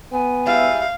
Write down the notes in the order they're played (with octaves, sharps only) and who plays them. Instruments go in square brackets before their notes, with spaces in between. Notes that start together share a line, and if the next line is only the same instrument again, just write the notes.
[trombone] B3 [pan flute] G#5
[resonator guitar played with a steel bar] G3 G#3 E4 [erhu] F5